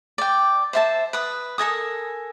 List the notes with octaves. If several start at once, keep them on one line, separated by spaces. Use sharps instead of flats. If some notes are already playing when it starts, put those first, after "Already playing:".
D5 G5
C5 E5 A5
B4 D#6
A4 A#4 G#5 D#6